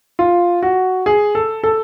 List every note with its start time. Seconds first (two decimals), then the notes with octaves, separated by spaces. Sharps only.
0.19 F4
0.63 F#4
1.06 G#4
1.35 A4
1.64 A4